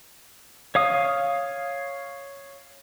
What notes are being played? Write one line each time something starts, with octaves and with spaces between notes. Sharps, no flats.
C#5 F5 D#6